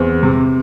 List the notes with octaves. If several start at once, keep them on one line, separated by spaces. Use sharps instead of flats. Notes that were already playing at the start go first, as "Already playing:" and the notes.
Already playing: E2 C4
C3